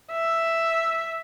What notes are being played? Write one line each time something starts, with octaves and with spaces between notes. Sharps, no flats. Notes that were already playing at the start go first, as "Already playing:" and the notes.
E5